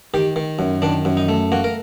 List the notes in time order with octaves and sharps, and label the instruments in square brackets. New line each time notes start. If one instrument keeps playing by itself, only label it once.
[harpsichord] D#3 G4
D#3
F#2
D#3 D4
F#2
D#4
A3
A#3 F#4
A#4